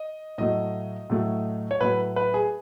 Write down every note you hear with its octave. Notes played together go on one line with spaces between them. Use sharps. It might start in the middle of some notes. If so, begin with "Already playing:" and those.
Already playing: D#5
A2 F#3 A3 D#5
A2 F#3 A3
C#5
A2 F#3 A3 B4
B4
G#4